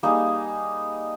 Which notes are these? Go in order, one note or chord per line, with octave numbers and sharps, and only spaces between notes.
G3 A#3 D#4 G#4